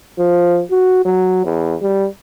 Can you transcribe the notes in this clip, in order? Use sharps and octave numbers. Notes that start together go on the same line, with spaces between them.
F3
F#4
F#3
E2
G3